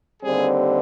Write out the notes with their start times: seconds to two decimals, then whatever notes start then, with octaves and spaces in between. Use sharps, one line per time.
0.23 D#2 D3 G3 C4 G#4